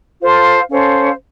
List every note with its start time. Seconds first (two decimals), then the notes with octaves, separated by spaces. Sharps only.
0.20 F4 A4 C5 F5
0.70 C#4 A4 C5 F5